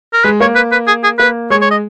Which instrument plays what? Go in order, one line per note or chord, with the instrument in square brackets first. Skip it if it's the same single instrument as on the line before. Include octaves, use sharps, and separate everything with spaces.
[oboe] A#4
[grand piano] G#3 [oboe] B4
[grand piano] A#3 [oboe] C#5
[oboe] B4
B4
G#4
G#4
[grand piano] A#3 [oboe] B4
[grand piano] G#3 [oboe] C#5
[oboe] C#5
D#5